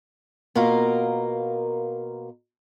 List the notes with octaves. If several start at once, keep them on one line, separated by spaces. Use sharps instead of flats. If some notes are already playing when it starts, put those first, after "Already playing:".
B2 A#3 F4 A#4